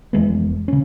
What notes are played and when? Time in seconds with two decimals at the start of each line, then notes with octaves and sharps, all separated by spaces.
0.13 F1 E3 G#3 B3
0.68 C#3 C#4